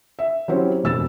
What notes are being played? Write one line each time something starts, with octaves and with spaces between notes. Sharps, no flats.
E5
F#3 C4 C#4 E4 G4 C5
E1 F2 E6 A6 E7